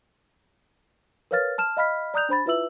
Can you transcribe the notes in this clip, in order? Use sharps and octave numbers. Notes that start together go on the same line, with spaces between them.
A#4 B4 C#5 F5 F6 A6
A5 F6 E7
D#5 F5 B5 F6 B6
D5 A#5 D#6 F#6 G6 F7
D4 C5 B5 A6
E4 F4 B4 E5 E6 F#7